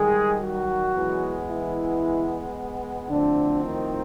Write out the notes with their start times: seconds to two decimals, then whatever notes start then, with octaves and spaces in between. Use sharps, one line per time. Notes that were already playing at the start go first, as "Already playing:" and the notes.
Already playing: D#3 G3 G#3 G#4
0.40 F#3 F#4
0.94 E3 G#3 B3
1.48 E3 E4
3.10 A2 D3 F3 A3 C4 D4
3.63 D#3 D#4